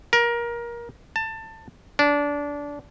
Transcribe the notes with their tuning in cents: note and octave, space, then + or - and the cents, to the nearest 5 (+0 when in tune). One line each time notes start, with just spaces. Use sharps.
A#4 +20
A5 +20
D4 -20